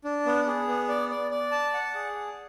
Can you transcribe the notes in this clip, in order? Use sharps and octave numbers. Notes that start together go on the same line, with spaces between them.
D4
B3
G#4
B3
D5
D5
D5
A5
F#5
G#4